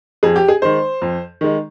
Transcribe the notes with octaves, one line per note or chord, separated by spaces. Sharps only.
F2 G#4
G4
G#4
D#3 G#3 C5
F2
D#3 G#3